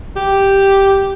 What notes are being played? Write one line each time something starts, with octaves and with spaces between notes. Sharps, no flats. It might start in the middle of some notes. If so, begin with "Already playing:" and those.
G4